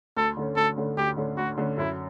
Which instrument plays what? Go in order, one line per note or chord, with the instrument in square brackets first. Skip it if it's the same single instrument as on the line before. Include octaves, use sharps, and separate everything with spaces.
[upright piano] D2 [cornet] A4
[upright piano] D3 A3 C#4
[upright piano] D2 [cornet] A4
[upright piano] D3 A3 C#4
[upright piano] D2 [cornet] G4
[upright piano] D3 A3 C#4
[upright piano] D2 [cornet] F#4
[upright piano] D3 A3 C#4
[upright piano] F#2 [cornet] E4